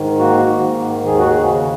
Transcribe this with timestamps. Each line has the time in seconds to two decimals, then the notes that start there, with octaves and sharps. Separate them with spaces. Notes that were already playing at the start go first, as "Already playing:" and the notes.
Already playing: G#2 D#3
0.19 A#3 F#4
0.48 G#2
0.77 D#3
1.06 D#2 G#4
1.19 F#4
1.30 G#4
1.35 C#3